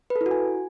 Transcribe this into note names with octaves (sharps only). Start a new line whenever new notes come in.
B4
A4
E4
F#4
G#5